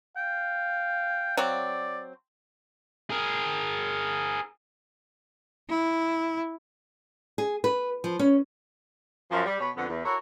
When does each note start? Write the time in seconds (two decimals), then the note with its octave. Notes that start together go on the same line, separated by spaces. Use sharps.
0.17 F5 G5
1.37 F#3 C4 D5
3.10 G#4 A#4
5.69 E4
7.38 G#4
7.64 B4
8.04 F3
8.19 C#4
9.31 F#2 F3
9.45 G3
9.60 B2 B4 C#5
9.76 F2 D3 B3
9.88 E2
10.04 E4 F#4 A4 A#4 C#5